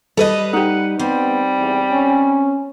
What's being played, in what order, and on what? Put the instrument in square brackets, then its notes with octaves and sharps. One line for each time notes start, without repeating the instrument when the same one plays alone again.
[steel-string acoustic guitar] G3 B4 D#5 [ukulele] A4
[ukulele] D#4 G4 [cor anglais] F#5
[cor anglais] G3 [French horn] B3 [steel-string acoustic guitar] C4
[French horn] E2
C#4